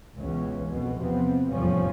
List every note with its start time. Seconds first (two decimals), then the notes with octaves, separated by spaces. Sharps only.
0.17 C#2 B2 E3 C#4
0.69 C2 F2 B2
0.99 E2 C3 F3 B3 C4
1.50 F1 E2 A2 F3 G3 C#4